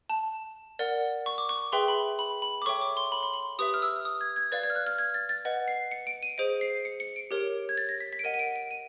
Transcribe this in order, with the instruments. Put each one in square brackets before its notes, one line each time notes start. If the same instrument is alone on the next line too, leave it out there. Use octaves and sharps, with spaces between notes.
[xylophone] A5
A#4 D5 F#5
C#6
D6
C#6
G#4 B4 E5 G5 C6
B5
B5
B5
D6
A4 C#5 E5 G5 C#6
D6
C6
B5
C6
B5
G4 B4 E5 D#6
F6
E6
D#6
G#6
G#6
B4 D5 F5 A6
G#6
F6
F#6
F6
G#6
A6
A6
B4 D#5 F#5
C7
C#7
D7
D#7
G#4 C5 D#5 D7
C7
C#7
C#7
D7
G4 A#4 C#5
G#6
A6
A#6
B6
B6
D7
A#4 D#5 F#5 D#7
D#7
D7
D7
D#7